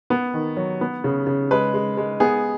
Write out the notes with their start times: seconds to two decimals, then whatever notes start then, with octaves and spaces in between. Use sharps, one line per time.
0.10 B3
0.34 D#3
0.57 F#3
0.81 B3
1.04 C#3
1.27 C#3
1.51 G#3 B4
1.74 G#3
1.97 G#3
2.20 B3 G#4